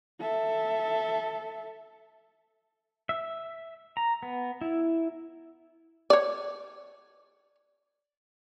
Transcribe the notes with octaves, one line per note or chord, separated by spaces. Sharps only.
A4 E5
E5
A#5
B3
E4
C#5 D5